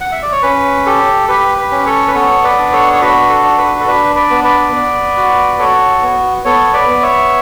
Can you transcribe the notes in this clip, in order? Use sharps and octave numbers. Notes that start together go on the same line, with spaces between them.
F#5
E5
D5
C#5
C#4 B4
G4 A4
G4 B4
B4
C#4
A4 C#5
B4
B3 A4 C#5
B4 D5
D4
A4 C#5
C#5
F#4 B4
A4
D4
B4
A4
D4 B4
B4 D5
B3
B4 D5
B3
F#4
F#4 A4 C#5
B3
B3 A4 C#5
B4 D5
B3
C#5 E5